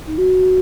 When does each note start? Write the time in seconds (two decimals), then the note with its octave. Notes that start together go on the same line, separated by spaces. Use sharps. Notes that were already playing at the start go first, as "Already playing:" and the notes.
0.06 D#4
0.17 F#4